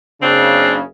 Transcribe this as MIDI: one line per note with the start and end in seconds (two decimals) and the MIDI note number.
0.22 0.82 30
0.22 0.82 49
0.22 0.75 60
0.22 0.79 62